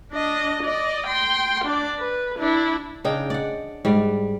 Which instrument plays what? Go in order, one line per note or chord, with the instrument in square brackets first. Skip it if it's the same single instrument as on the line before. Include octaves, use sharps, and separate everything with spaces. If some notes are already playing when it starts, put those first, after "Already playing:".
[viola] D4 D#5
D5 D#5
G5 C6
D4 D5
B4
D4 E4
[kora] C#3 D4 D#4 G5
D5 F#5
G#2 G3 D5